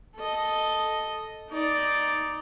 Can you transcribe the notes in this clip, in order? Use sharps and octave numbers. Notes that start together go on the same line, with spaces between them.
A4 D#5
D#4 D5